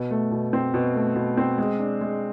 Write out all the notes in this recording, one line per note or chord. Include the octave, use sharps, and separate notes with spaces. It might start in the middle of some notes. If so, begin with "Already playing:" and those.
Already playing: B2
A3
B2
C4
B2
A3
B2
C4
G#3
D4
G#3